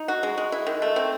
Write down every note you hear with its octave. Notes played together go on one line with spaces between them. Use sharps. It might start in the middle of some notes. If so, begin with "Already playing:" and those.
Already playing: D#4
F#4
G#3
G#3
E4
D#3
A3
C4